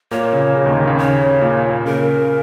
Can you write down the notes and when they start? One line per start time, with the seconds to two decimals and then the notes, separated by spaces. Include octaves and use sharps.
0.11 A#2 A#3 C#5
0.33 C#3
0.55 C#3
0.66 D#2 D#3
0.77 C#3
0.87 C#3
0.99 C#5
1.41 A#2
1.85 C#3 A#4